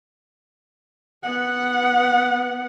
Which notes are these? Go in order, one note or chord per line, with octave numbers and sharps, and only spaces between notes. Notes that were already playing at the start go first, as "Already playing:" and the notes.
B3 F#5